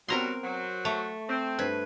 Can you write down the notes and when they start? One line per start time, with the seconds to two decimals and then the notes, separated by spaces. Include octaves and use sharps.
0.08 F#3 G3 B3 C4 A#4 A#5 C6
0.43 F#3 C5
0.85 A3 C#6
1.29 C4
1.59 G2 B4 C5 G#6